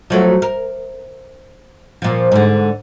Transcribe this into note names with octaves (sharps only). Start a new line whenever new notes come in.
F3 F#3 A3
A#4
A#2 F3
G#2 D3